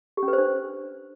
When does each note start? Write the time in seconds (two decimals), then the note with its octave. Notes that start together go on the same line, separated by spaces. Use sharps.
0.17 G4
0.23 C#4
0.28 B4
0.33 C5
0.38 D4